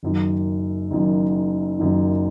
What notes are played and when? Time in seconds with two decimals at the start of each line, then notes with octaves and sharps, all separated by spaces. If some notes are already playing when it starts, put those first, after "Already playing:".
0.03 F#1 F#2 D#3
0.91 F#1 F#2 D#3
1.79 F#1 F#2 D#3